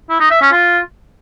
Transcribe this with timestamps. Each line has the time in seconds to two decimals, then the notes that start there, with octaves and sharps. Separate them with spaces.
0.10 E4
0.20 D#4
0.31 E5
0.41 C#4
0.52 F4